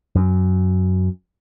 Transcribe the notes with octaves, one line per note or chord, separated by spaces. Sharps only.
F#2